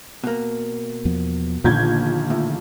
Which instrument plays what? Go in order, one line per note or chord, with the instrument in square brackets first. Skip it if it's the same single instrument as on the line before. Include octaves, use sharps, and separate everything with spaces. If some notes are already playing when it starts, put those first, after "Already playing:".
[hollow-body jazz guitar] B2 A#3
[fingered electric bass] E2 F3 B3
[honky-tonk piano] A#1 G6 G#6 [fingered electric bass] A#2 D3 D#3
[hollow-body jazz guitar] A2